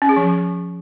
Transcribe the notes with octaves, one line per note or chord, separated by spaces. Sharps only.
C#4
G#4
F3